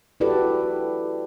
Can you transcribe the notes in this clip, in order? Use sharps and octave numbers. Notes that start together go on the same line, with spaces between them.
E4 F#4 G4 A4 B4 D5